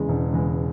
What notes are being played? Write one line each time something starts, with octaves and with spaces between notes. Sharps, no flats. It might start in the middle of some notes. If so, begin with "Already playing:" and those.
Already playing: E2 C#3 G#3
E1
E2 C#3 G#3